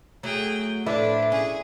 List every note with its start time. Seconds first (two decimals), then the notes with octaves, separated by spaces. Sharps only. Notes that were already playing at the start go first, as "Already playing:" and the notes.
0.23 F#3 A3 G#4 G5
0.86 A2 F3 D4 E4 A4 B4 D5 E5
1.32 C#4 G#4